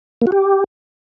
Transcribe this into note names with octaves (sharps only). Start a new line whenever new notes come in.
A#3
F#4
G4